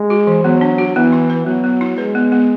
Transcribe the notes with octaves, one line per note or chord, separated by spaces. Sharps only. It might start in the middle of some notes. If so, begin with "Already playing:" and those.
Already playing: G#3
F#4
E3
F#3 B3
D4
F#4
E3 B3
E4
B4
F#3 B3
B3
E4
G#3 B4
B3
B3